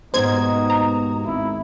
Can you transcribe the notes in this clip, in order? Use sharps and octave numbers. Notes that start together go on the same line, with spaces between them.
D#2 G#2 B2 D#4 F#4 C5 G#6
A#5
G#1 E4